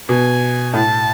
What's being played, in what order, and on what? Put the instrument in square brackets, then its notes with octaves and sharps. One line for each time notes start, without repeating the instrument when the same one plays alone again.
[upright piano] B2 [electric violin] G#5
[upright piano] A2 [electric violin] A5